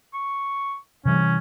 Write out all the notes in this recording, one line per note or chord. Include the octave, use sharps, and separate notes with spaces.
C#6
C3 E3 G3 C#4